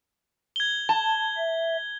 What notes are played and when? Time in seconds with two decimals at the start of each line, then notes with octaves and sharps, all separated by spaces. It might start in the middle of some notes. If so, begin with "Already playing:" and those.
0.56 G#6 G7
0.89 A5
1.37 E5